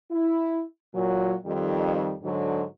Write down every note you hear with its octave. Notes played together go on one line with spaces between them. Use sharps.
E4
A#2 F#3
F2 D#3 G3
G#2 D3 F#3